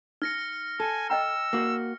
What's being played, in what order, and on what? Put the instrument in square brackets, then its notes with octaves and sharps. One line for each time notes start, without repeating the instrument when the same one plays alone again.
[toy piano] D#4 [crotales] F6 A#6 C#7
[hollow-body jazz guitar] A4 [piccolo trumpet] G#5
[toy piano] D#5 G5 A#5 [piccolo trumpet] E6
[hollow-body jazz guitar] A#3 F#4